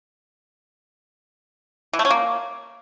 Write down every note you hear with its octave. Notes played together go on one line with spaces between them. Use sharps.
E3
A3
C#4
A#3